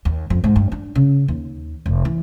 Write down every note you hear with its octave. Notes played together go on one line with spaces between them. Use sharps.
D#2
F2
G#2
G2
D4
C#3
D#2
F1
E3